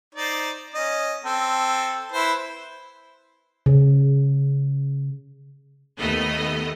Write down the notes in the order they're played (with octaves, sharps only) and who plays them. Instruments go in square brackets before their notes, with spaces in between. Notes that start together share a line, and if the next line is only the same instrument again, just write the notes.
[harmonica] D#4 C5 D5
C#4 D#5
C4 A4
E4 B4 C5
[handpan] C#3
[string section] D#2 D#3 A3 B3 D#5